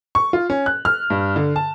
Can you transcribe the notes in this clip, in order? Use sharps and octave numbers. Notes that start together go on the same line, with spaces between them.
C#6
F4
C#4
F#6
F6
G2
D3
A5